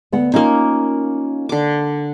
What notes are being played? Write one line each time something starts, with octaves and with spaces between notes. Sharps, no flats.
D2 B3 F#5
A#3 C#4 D#4 F4 A#4
D3 D6